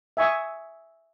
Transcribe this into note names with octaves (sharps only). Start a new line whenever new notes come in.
E5 G#5 C#6 D#6